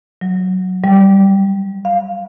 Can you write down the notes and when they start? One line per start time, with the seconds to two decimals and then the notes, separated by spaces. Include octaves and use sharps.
0.21 F#3
0.84 G3
1.85 F5